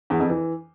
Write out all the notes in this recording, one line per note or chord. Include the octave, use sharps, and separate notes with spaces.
E2
F2
E3